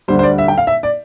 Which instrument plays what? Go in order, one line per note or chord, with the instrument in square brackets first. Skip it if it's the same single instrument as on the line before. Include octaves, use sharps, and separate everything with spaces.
[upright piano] D2 D3 G3 C5
C5
D5
E5
G5
F5
E5
D5